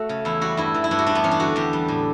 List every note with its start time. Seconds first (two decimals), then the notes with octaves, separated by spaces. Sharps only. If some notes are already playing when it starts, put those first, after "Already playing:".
Already playing: A3 F#4
0.09 C#3
0.25 E2 E4
0.41 G3 F#4
0.57 G2 E4
0.75 E3
0.84 E4
0.91 G2 D4
0.99 F#4
1.06 G3 D4
1.15 B3
1.24 E2 C#4
1.31 D4
1.40 D3 F#4
1.56 E2 G4
1.73 G3
1.88 A2